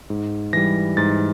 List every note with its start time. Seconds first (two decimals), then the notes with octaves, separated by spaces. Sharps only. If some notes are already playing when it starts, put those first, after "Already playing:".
0.10 G#2
0.53 E3 G3 A#6
0.97 G#2 A6